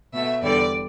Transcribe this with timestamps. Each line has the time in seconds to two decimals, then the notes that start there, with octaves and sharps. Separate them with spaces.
0.13 B2 A3 E5
0.42 E2 D3 G3 D5